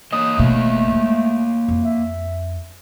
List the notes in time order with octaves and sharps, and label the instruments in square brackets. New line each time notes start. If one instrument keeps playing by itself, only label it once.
[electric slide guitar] A#3 C#5 D#5 [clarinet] D#6
[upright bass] F#1 B2 [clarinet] A3
[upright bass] G#3
F2
[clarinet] E5